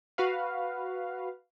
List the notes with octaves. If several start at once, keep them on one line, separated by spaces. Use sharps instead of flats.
F#4 B4 F5